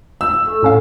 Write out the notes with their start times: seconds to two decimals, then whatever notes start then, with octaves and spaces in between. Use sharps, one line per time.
0.21 E6
0.45 A3
0.63 A2 C#4 F5